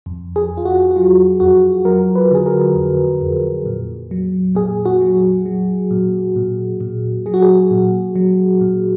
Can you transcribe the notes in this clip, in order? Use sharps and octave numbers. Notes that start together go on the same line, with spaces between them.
F2
G#4
F2
F4
F#4
F#4
F#3 F4
F2 F#4
F#3 A#4
B4
D3 G#4
A#4
F2
F2
A#2
F#3
A#2 G#4
F#4
F#3
F#3
A#2
A#2
A#2
F#3 G#4
F#4
G#4
A#2
F#3
A#2